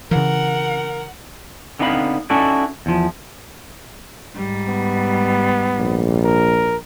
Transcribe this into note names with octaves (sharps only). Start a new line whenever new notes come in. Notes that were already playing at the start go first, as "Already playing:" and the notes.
C#3 E3 A#4 F#5
D3 B3 C4 D#4 F5 B5
C#4 D#4 E4 F#4 A4 D5
E2 F3
G#2 G3
B3
A#1
A#4